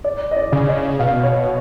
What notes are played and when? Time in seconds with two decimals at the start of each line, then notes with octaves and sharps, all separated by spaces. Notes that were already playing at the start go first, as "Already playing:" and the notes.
0.04 D5
0.31 D#5
0.37 D5
0.52 C#3
0.68 D#5
0.99 B2 F5
1.24 C#5